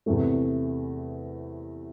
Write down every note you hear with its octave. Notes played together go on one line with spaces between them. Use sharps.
E2 C3 E3 A3